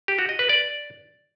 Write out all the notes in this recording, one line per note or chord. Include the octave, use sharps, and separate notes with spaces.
G4
F#4
D#5
B4
D5